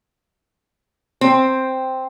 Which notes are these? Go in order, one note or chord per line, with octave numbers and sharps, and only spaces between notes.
C4